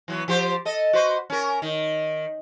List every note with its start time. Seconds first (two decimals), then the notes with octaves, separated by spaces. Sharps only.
0.08 E3 F#3 B3
0.28 F3 G4 C5
0.65 A4 D#5
0.93 F#4 B4 C5
1.30 C#4 A#4
1.62 D#3